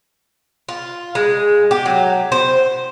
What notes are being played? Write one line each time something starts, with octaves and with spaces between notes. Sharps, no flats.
F4
G#3
G4
F#3
C5